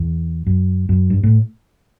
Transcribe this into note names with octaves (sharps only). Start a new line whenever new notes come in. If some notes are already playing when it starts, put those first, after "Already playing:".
Already playing: E2
F#2
F#2
G2
A2